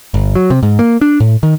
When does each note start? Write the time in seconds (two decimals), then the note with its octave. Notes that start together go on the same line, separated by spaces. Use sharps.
0.14 G1
0.35 F#3
0.50 C3
0.63 G#2
0.79 A#3
1.01 D4
1.20 A2
1.43 D#3